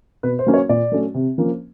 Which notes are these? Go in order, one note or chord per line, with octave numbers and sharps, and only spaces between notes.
B2 B4
C5
F#3 A#3 C#4
C#5
A#2 D5
F#3 A3 C#4
C3
F3 A#3 C#4